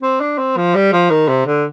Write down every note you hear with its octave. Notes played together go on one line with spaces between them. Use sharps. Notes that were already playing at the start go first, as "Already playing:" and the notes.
C4
D4
C4
F3
G3
F3
D#3
C3
D3